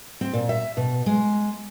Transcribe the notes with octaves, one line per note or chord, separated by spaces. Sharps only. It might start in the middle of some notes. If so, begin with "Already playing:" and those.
C4
A#2
E5
B2
G#3